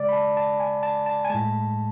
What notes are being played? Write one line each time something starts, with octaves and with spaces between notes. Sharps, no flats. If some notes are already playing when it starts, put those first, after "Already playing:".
Already playing: C#3 G#3 D5
B5
A5
A5
G#5
A5
A5
G#5
A2 G#3 A5